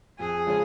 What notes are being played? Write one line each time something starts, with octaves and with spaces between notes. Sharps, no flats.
F2 G#4
C#3 F3 G#3 C#4